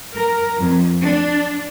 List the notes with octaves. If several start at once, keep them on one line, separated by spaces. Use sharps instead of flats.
A#4
F2
D4